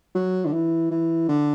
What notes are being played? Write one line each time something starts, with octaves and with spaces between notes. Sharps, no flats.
F#3
D3
E3
E3
D3